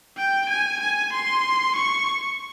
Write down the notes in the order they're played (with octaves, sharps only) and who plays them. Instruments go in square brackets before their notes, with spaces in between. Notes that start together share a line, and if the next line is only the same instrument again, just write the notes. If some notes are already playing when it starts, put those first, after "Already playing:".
[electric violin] G5
G#5
G#5
C6
C#6